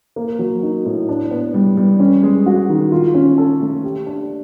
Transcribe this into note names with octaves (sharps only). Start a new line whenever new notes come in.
A#3
F#3
D#4
A2
D4
B3
G3
G3
C#4
G#3
F#4
D#3
F4
C#4
A4
A3
G4
D4